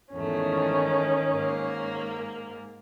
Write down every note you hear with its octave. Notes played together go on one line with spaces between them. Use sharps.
E2 G#2 D#3 A3 C#4
G#2 A#3